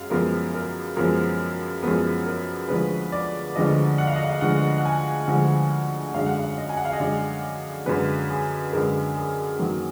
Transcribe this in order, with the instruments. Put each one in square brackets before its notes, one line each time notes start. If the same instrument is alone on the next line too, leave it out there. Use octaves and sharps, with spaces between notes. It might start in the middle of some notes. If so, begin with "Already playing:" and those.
Already playing: [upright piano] F#2 G#3 F5
F#2 F3 G#3 B3 A#4
A#4
F#2 F3 G#3 B3 A#4
F#2 F3 G#3 B3 A#4
A#4
D2 D3 F3 G#3 B4
D5
D2 D3 F3 G#3 D#5
F#5
F5
D#5
F5
D2 D3 F3 G#3 F#5
F#5
G#5
D2 D3 F3 G#3 F#5
F#2 D3 G#3 F5
F#5
F5
D#5
G#5
F#5
F5
D#5
F#2 D3 G#3 D5
F#2 D3 G#3 B4
G#4
F#2 D3 G#3 A#4
G#4
F#2 D#3 F#3 A#3